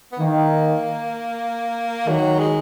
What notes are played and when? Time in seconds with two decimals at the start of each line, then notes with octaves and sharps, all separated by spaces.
0.12 B3
0.19 D#3 A#3
2.07 D#3 F#3
2.39 G#3